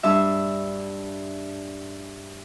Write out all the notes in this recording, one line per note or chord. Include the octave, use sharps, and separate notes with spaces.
G2 D4 E5